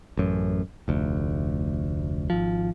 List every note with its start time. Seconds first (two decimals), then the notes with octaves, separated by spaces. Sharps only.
0.17 A1 F#2
0.88 F1 D2
2.30 G#1 F3